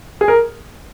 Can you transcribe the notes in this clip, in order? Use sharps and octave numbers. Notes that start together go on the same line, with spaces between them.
G#4
A#4